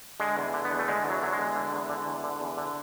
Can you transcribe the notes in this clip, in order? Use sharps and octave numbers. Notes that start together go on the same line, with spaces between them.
D3 G#3
E2
D3
B3
E2
A3
D3 G#3
E2
F#3
D3 F#3
G#3
E2
D3
E2
D3
E2
D3
E2
D3